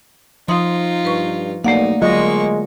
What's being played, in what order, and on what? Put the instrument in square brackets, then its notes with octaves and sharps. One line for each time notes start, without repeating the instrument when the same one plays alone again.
[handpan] F3 [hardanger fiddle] D#4 F4 [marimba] C6 D#6
[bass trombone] G2 [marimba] B4 C#6
[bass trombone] B1 [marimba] A3 D5 F#5 [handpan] A#3 [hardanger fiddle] D#4
[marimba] D3 [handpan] F#3 F4 D#5 [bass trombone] G#3 [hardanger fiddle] A#3 C#6